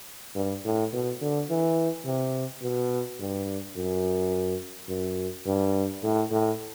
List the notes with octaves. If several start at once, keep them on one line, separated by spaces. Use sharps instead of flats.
G2
A2
B2
D3
E3
C3
B2
G2
F#2
F#2
G2
A2
A2